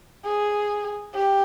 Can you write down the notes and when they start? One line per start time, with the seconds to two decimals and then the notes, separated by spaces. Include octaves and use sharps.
0.25 G#4
1.14 G4